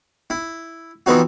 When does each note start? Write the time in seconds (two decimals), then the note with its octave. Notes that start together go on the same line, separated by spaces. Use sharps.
0.30 E4
1.06 E3 F3 B3 C4 D#4 F#4